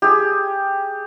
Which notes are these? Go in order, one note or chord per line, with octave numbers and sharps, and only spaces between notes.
G4 G#4